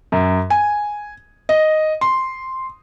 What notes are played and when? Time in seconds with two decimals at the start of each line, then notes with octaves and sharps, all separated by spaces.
0.12 F#2
0.50 G#5
1.49 D#5
2.01 C6